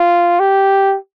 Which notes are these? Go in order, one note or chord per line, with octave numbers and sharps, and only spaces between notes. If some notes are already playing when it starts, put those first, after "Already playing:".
Already playing: F4
G4